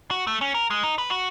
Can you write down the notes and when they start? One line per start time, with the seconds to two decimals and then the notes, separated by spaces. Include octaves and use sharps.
0.11 F#4
0.27 A3
0.41 C#4
0.54 A#4
0.70 G#3
0.84 D#4
0.98 B4
1.10 F#4